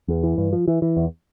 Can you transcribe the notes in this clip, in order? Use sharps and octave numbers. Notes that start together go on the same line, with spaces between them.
E2
E3
G2
F3
E3
E3
E2